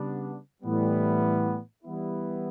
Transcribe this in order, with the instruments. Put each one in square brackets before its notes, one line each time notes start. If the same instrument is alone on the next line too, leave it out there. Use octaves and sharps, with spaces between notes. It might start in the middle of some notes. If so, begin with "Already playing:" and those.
Already playing: [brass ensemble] C#3 G3 B3 D4
A2 E3 G3 B3
E3 G3 B3 E4